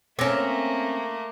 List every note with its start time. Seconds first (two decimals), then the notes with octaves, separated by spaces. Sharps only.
0.19 A3 A#3 C4 C#4 D6 A#6